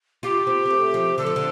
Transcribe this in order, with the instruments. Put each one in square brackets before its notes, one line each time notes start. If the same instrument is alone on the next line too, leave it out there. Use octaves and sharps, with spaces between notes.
[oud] F4 [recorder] G4
[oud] C4
C4
A3
F3
[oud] D3 [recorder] A4
[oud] F3
D3